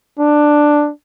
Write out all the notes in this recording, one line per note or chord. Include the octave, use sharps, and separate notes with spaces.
D4